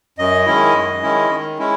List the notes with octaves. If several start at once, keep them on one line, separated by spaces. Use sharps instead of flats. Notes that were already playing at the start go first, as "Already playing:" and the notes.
F#2 D#5
D#3 G#3 C#4 E4
F#2
D#3 G#3 C#4 E4
D#3
G#3 C#4 E4